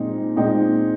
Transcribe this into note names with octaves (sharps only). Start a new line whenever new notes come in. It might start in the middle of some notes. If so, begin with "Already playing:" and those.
Already playing: A#2 G#3 C4 D#4
A#2 G#3 C4 D#4 G5